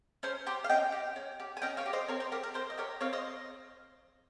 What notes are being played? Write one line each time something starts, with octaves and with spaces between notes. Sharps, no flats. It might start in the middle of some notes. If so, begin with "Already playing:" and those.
C#4 C5
G4 C5
F5
C#4 D#5 G5
G4
C#4
G4
G#5
C#4 D#5 G5
C#5 F5
G4
C5 D#5
C4 A#4 C#5
C5
G4 A#4
A#4
C4 C5
D#5
G4 A#4 C#5
C4 C#5 F5
C5 D#5